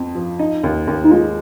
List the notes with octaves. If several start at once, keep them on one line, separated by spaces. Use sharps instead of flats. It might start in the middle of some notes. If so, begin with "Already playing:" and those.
Already playing: F2 C4
F3
D#4
D#2
D#2
D#4
G#3 F4